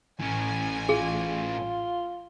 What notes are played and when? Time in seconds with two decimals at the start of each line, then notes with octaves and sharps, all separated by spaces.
0.20 A1 A2 C#4 G#5
0.89 F4 G#4